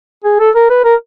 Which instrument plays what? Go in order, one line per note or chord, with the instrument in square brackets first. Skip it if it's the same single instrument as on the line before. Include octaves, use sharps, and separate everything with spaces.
[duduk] G#4
A4
A#4
B4
A#4